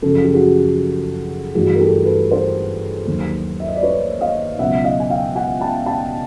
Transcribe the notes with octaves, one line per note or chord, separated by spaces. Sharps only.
F#2 C#3 F3 A4
G#4
G4
F#4 G#4
G2 E3 A3 F#4 G#4
A#4
G4 A4
A4 B4
A#4 C5
D#2 D#3 F#3
E5
D#5
D5
B4 C#5
D#5 F5
C#2 B2 F#3 E5 F#5
D#5 F5
G#5
F5 G5
F#5 G#5
G5 A5
G5 A5